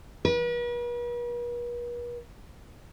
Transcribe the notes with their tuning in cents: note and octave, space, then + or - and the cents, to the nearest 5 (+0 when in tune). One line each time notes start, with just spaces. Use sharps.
B4 -45